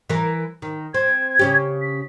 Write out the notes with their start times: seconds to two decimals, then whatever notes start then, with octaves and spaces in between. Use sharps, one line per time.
0.09 E3 A#4
0.62 D#3
0.94 C4 G#6
1.39 C#3 C#4 G4
1.82 B6